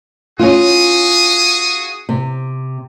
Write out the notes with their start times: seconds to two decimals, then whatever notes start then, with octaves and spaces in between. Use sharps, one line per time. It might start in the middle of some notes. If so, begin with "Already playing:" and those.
0.39 C#4 F4 F#4 G#4 D#6
2.09 C3